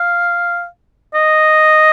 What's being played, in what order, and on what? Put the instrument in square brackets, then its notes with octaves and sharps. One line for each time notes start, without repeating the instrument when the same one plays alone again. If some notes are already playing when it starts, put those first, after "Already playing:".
Already playing: [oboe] F5
D#5